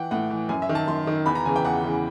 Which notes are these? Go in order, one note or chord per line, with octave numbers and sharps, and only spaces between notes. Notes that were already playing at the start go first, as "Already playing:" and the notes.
Already playing: E3 F#5 G5
A2 F#5
E3
F#2 G#5
E5
D#3
A5
F#2 C6
D#3
E2 B5
A#5
C#3 E3 G#5
G5
E2 F#5
C#3 E3